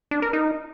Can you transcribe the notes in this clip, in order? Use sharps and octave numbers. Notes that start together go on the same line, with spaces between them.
D4
A#4
D#4